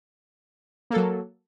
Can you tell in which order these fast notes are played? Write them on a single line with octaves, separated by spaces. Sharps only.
A#3 A4 F#3